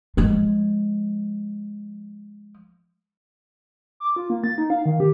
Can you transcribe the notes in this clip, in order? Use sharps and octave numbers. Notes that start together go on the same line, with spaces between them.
F3 G#3
D6
F4
A#3
A6
D#4
F5
D#3
G4